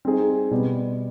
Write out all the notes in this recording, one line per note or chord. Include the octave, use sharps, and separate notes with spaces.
G3 C4 D#4 G#4
B2 G3 B3